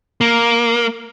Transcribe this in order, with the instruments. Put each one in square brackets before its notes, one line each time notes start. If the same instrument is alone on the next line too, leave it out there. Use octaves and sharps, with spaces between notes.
[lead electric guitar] A#3